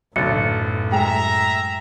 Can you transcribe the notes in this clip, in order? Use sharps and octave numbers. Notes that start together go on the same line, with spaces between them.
B1 F#2 A2 D3 A6 C#7
G#3 E5 G5 A#5